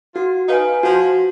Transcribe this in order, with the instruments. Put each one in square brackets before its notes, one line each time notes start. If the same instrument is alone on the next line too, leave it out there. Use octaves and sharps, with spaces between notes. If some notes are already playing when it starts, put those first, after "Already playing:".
[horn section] F4 [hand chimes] F#4
[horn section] D#4 [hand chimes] B4 F5 G#5
[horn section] F3 [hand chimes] F#4